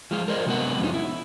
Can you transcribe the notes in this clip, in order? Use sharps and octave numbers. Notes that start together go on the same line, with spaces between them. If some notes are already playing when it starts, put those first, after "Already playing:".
F3 G#3 F4
A#4 C5 D5 D#5
C3 F#3 G#3 B3 D4 F#5
F2 C3 G#3 C4 C#4 D#4
E4